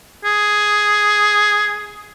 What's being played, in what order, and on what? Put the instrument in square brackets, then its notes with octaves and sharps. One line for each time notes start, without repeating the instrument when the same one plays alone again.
[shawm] G#4